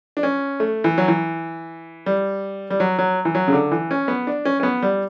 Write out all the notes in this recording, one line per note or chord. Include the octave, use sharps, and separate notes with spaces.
D4
C#4
A3
E3
F#3
E3
G3
G3
F#3
F#3
E3
F#3
C#3
D3
E3
C#4
B3
D4
C#4
C#4
B3
G3